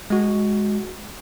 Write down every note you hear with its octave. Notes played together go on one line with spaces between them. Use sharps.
G#3 F#4